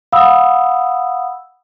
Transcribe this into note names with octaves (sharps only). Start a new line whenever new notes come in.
F5 F#5 B5 D#6 E6